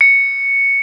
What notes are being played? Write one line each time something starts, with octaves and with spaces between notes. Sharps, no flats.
C#7